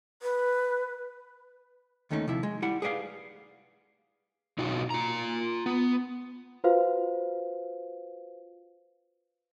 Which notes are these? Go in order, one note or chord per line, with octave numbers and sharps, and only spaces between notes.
B4
D#2 D#3 A3 C#4 D#4
C3 F3 E4 E5
G#3
G3 E4 F#5
G#4 B4 D5 D#5 F5
B2 D#4 F4 F#4
F4 A#5
B3
F4 F#4 B4 C5 F5